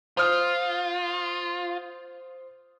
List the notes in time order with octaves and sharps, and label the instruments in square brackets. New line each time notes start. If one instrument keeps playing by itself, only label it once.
[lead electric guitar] F4 [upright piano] C5 D#6 F6